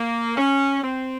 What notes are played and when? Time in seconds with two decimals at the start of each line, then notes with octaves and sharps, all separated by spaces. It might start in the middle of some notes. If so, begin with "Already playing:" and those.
Already playing: A#3
0.37 C#4
0.83 C4